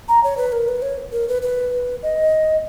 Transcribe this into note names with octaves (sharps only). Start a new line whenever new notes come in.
A#5
C#5
B4
A#4
B4
C#5
A#4
B4
B4
D#5